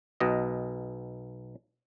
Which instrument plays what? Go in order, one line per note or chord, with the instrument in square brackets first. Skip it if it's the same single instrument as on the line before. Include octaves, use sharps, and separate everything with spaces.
[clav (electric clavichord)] B1 B2 D#5